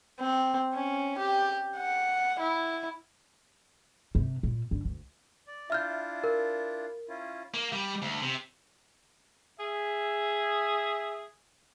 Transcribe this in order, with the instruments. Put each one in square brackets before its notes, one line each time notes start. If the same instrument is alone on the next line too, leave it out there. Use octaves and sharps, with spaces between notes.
[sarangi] C4
C#4
G4
F#5
E4
[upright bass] C3
A#2
D3
D2
[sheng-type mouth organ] D5
[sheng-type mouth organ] D4 E4 F4 [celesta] E5 F6 G6
[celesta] A#4
[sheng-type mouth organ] C#4 E4 F4
[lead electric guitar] A#3
G3
D2
C3
[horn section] G#4 E5